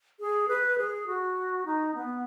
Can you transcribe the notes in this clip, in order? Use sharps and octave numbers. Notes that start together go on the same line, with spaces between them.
G#4
B4
G#4
F#4
D#4
B3